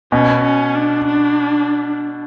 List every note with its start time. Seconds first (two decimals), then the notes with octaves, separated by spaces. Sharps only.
0.12 B2 C#4
0.44 C#4
0.75 D4
1.07 D4